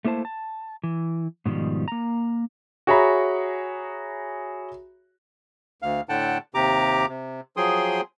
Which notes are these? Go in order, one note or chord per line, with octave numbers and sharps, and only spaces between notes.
A3 A#3 E4 C5 A5
A5
E3
G#2 B2 D#3 F3 G3
A#3 A#5
F#4 G#4 C#5 E5 A#5 B5
D2 F5
A2 D3 F#5 G5 A5
D#2 C3 G4 A#5 D6
C3
F3 F#3 G#4 G5 C6 D#6